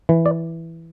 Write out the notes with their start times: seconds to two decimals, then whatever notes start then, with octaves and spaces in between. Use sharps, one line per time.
0.09 E3
0.26 D5